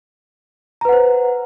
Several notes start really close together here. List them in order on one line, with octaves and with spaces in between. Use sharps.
A#5 B4 F#5 C5